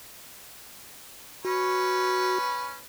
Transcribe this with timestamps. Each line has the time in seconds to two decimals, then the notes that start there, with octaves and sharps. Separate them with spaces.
1.45 C#4 F#4 B4